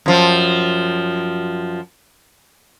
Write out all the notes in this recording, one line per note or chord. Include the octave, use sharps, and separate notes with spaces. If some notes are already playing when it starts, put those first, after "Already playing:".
F#2 F3